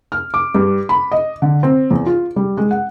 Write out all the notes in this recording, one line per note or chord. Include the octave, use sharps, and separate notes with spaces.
F6
D6
G2
B5
D#5
D3
C4
E2
F4
G3
G#3
F#5